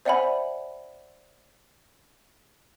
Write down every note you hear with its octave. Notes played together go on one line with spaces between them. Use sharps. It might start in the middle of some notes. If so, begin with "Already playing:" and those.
C5 D5 E5 F#5 G#5 B5